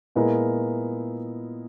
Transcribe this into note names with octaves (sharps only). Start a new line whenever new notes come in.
A#2 G#3 B3 E4 A#4